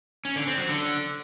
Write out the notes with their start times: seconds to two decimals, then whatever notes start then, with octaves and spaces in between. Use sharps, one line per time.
0.25 C#4
0.36 D3
0.47 C4
0.58 F#3
0.69 D3